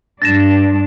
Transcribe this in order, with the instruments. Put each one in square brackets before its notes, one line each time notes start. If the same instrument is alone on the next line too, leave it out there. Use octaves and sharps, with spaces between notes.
[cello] G2 D4 [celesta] A6 A#6 E7